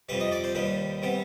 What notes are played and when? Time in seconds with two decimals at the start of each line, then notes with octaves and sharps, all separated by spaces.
0.09 F2 C3 G3 B4
0.20 D#5
0.32 D5
0.44 C5
0.55 D#2 D#3 G3 B4
1.02 C3 G3 B3